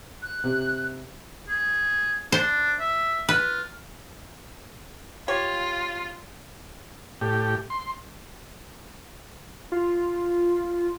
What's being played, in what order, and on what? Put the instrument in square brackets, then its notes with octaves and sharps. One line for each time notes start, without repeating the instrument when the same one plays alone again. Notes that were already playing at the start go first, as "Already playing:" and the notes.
[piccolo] F#6
[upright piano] C3
[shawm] G#4
[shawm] D4 [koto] C5
[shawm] E5
[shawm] F4 [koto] B4
[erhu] F4 [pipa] G4 C#5
[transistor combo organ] A2 G4
C6
[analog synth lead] F4